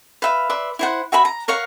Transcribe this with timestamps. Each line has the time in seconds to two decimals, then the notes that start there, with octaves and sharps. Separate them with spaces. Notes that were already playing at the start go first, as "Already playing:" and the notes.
0.22 B4 E5 F5
0.50 B4 D5 E5 C6
0.79 E4 C5 F#5
1.12 F#4 E5 G#5 B5
1.25 A#5
1.48 A#4 C#5 F5 F#5